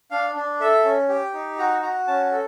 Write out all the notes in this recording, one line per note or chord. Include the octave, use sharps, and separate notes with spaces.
D4 F5
D4
A4 E5
C#4
G4
D#4
F#4 A#5
F#4 A#5
C#4 A5
A4